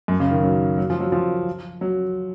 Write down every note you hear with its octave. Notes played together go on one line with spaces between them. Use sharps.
F#2
C#3
D#3
F#3
F#3
F3
F#3
F3
F#3